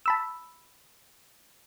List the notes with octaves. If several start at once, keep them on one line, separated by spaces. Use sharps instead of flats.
A5 B5 E6